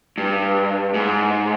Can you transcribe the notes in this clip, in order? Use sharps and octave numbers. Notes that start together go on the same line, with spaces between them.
G2
G#2